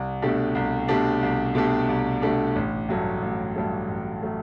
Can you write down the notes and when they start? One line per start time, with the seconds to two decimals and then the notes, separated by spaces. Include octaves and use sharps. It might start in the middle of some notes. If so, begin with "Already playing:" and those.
Already playing: C2
0.22 B2 A3 D4 G4
0.55 C2
0.88 B2 A3 D4 G4
1.22 C2
1.55 B2 A3 D4 G4
1.88 C2
2.22 B2 A3 D4 G4
2.56 A1
2.89 G2 F#3 A3
3.22 A1
3.56 G2 F#3 A3
3.88 A1
4.23 F#3 A3